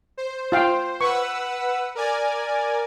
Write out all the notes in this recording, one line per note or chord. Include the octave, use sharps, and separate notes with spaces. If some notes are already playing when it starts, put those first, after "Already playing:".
C5
F4 F5 G5
B4 F#5 C#6 E6
A#4 D5 G#5